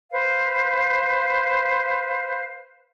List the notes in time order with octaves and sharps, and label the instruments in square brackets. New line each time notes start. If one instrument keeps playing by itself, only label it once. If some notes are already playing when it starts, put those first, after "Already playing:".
[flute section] B4 C5 F5